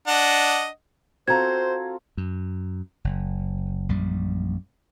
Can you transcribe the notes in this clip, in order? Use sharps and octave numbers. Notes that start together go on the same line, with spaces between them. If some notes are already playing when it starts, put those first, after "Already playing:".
D4 D#5 F#5
C4 F4 F#4 A4 C5 A#5 G#6
F#2
F#1
A#1 F#2 G3